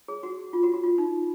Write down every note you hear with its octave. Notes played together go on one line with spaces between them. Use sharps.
G#4
F#4
F4
F#4
F#4
F4
D#4